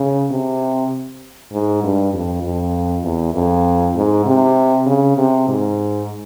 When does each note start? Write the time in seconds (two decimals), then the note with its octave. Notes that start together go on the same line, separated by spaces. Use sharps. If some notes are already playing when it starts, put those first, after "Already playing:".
Already playing: C#3
0.31 C3
1.53 G#2
1.84 G2
2.14 F2
2.43 F2
3.04 E2
3.34 F2
3.96 G#2
4.26 C3
4.86 C#3
5.18 C3
5.48 G#2